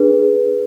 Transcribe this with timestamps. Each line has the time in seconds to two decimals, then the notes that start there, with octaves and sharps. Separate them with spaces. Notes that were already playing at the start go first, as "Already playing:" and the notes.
Already playing: D4 G#4 B4